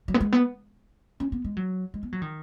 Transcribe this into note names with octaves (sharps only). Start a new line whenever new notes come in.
F#3
B3
G#3
B3
C#4
B3
G#3
F#3
G#3
B3
F#3
D#3